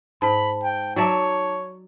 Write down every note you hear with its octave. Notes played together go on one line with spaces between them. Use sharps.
G#2 A5 B5
G5
F#3 D#4 C#5 D5 E5 A5 D6